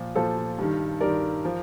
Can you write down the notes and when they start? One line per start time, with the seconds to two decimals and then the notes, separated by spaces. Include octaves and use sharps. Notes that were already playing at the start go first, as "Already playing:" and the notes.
Already playing: A#2 F3
0.15 A#2 F3 A4 C5
0.58 G2 D#3
1.00 G2 D#3 A#4 D5
1.45 F3